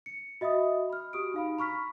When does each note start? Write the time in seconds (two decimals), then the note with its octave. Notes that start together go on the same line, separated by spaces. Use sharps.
0.06 C#7
0.41 F#4 D#5 E5 B5 D#6
0.90 B5 F6
1.13 F#4 G4 D#6 F6 D7
1.34 D#4 F5 B5
1.57 A#5 B5 C#6 F6 B6